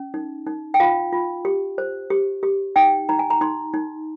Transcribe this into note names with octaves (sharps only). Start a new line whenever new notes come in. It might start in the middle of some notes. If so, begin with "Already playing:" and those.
Already playing: C#4
D#4
D#4
G5
F4 F5
F4
G4
C5
G4
G4
D#4 G5
D#4 A#5
G#5
A#5
D#4 C6
D#4